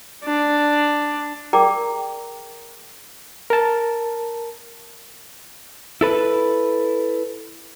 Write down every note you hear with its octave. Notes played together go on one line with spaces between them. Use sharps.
D4
G#4 A#4 D5 G5 A#5 D6
A#4 A5
E4 A4 B4